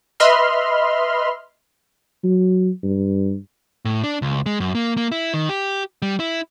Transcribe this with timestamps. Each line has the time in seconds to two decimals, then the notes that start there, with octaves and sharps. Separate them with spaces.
0.20 B4 D#5 E5 B5 C6 F6
2.24 F#3
2.83 G2
3.85 A2
4.03 D4
4.22 C#2
4.46 G#3
4.60 F#2
4.75 A#3
4.97 A#3
5.12 E4
5.34 D#3
5.49 G4
6.02 G3
6.20 E4